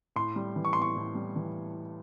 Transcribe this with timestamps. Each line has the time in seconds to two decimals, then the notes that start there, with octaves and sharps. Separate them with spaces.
0.16 A2 C6
0.36 G3
0.56 E3
0.65 C#6
0.73 A2 C6
0.82 C#6
0.96 A2
1.15 G3
1.36 E3